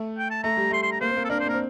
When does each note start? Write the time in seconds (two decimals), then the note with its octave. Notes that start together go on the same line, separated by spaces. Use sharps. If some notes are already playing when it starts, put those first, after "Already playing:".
Already playing: A3
0.18 G5
0.31 A5
0.43 A3 A#5
0.57 G3
0.70 A3 C6
0.83 C6
0.92 A#5
1.01 A#3 C5
1.09 C4
1.17 A#3
1.25 A4
1.30 D4 A#4
1.38 C4 C5
1.46 A#3
1.49 A#4
1.54 C4